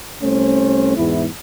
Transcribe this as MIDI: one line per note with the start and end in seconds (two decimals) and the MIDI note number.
0.22 0.94 36
0.22 0.94 57
0.22 0.94 61
0.22 0.94 72
0.97 1.26 40
0.97 1.26 44
0.97 1.26 64